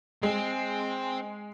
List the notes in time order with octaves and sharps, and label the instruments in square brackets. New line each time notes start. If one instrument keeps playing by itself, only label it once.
[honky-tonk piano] G#3 [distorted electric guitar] C4